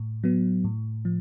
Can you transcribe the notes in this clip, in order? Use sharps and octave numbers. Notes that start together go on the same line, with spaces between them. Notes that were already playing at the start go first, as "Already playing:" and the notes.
Already playing: A2
F#3 B3
A2
F3